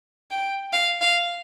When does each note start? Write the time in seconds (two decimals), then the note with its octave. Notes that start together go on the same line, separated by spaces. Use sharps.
0.31 G5
0.73 F5
1.01 F5